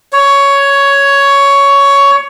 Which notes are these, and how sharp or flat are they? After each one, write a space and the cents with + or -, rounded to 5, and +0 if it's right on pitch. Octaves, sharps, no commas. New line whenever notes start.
C#5 +10